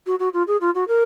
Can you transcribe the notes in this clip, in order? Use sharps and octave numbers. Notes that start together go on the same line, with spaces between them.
F#4
F#4
F4
G#4
F4
F#4
A#4